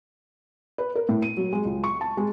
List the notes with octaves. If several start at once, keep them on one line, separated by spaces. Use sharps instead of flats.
B4
A#4
A2
D#7
F#3
G#3
C#2
C#6
A5
G#3